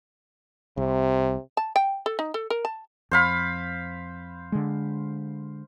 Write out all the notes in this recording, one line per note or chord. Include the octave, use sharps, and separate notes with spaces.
C2 C3
A5
G5
A4
D#4
A4
A#4
A5
F2 C5 F5 B5
D3 G#3